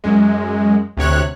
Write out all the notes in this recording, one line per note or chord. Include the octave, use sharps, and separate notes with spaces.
F#2 G#3
D2 C3 C#5 F#6